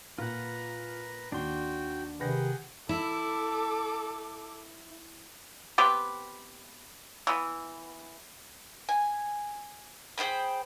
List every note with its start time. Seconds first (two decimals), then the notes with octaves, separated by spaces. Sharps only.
0.19 A#2 F4 B4 F#5 A#5
1.32 D#2 D4 F#4 G5 C6
2.20 C3 D#3 G#4 B4 F#5 G5 A#6
2.89 E4 A4 D6
5.78 B3 C4 G4 B4
7.27 E3 B3
8.89 G#5
10.18 G#4 C5 G5 B5